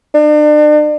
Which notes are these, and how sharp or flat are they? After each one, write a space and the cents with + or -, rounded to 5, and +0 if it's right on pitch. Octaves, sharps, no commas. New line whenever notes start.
D4 +40